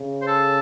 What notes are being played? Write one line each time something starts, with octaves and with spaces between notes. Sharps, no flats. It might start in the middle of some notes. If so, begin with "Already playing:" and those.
Already playing: C#3
C5
A4